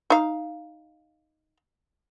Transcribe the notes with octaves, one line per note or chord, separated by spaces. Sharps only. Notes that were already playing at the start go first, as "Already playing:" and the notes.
D#4 F5